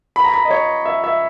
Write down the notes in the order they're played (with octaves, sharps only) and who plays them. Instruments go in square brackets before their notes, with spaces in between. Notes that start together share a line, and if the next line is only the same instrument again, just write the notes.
[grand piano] B5
A#5
B5
D#5
C#5
E5
E5